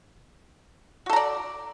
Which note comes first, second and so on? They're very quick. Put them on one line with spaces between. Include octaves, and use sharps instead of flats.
F#4 A4 A#5 D5